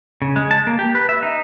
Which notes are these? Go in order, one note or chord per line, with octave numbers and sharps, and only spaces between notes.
C#3
G#3
A5
A#3
G4
B4
E5
D#4